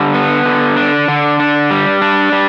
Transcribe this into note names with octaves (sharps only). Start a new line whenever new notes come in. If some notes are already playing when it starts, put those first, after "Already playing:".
Already playing: D3 G3
B3
D3
D4
D3
D4
G3
D4
G3